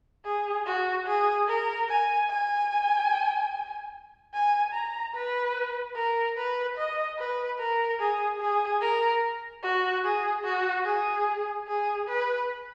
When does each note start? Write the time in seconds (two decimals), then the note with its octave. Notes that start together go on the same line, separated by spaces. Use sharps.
0.25 G#4
0.66 F#4
1.06 G#4
1.48 A#4
1.88 G#5
2.29 G#5
4.34 G#5
4.73 A#5
5.14 B4
5.96 A#4
6.37 B4
6.77 D#5
7.18 B4
7.59 A#4
8.00 G#4
8.40 G#4
8.81 A#4
9.63 F#4
10.04 G#4
10.44 F#4
10.85 G#4
11.68 G#4
12.08 B4